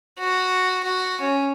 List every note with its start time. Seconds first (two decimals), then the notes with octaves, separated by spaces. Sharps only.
0.19 F#4
0.84 F#4
1.21 C#4